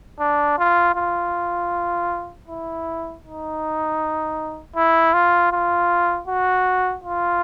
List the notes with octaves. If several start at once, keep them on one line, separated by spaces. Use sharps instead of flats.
D4
F4
F4
E4
D#4
E4
F4
F4
F#4
F4